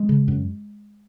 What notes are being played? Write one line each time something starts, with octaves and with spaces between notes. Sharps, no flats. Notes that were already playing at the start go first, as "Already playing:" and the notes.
Already playing: G#3
C#3
F#2